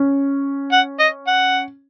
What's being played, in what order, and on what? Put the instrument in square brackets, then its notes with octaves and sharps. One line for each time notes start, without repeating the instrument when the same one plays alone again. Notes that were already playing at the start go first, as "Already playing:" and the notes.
Already playing: [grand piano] C#4
[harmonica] F#5
D#5
F#5